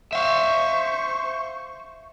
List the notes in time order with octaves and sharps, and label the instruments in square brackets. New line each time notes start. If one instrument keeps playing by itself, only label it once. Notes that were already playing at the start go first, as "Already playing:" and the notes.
[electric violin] C5 C#6 [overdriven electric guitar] E5 F5